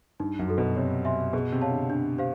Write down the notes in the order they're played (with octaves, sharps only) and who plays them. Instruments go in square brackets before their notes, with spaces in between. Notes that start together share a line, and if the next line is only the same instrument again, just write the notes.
[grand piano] G2 [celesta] D#4
[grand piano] F#2
[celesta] F#4 A4
[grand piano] B2
[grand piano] C3 [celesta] C#5
[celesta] E5 G#5 C6
[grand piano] B2 [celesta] G#4
[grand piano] C3
[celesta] C#5 F5 A5
[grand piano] D3
[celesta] D4
G4 C5 F5